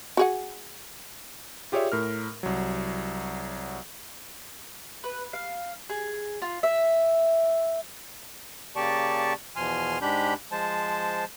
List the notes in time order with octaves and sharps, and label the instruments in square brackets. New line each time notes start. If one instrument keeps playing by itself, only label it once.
[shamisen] F#4 G#4 F#5
[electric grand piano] F4 G4 G#4 C#5 D5 E5
A2 A#4 F6
C2 F#3
[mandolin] B4
F5
G#4
F4
E5
[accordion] C#3 A#3 G4 D5 A5 C#6
E2 B2 F3 G#5 C6 F6
G#2 G#3 D4 G4 B5 G6
F3 G#3 C5 A5